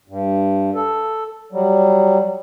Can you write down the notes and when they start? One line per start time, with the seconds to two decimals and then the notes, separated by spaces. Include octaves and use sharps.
0.08 G2
0.75 A4
1.52 F#3 G3